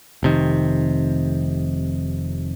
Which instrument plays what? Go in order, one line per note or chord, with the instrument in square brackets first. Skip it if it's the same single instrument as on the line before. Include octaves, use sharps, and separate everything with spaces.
[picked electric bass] F1 C3 D#3